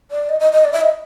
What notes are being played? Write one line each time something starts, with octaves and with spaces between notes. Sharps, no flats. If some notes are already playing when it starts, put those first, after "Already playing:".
D5
D#5
D#5
D#5
D5
E5
D#5